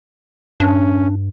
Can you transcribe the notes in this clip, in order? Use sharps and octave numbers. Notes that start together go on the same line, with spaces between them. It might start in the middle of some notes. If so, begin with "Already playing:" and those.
G2 C#4 D4